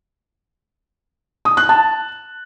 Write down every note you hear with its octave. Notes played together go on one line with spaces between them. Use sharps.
D#6
F#6
A5